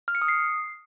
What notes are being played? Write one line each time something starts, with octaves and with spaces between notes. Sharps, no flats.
F6
C#7
D#6
C7